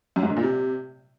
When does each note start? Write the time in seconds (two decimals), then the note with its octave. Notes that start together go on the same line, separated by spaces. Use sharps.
0.16 F#2
0.23 G#2
0.30 D3
0.36 A#2
0.43 C3